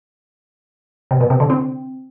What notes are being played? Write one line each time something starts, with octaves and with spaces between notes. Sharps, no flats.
C3
B2
C3
D3
C4